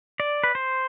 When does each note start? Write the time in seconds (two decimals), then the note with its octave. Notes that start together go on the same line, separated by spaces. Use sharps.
0.20 D5
0.44 B4
0.55 C5